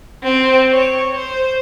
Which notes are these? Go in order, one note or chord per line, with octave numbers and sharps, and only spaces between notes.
C4
C#5
C5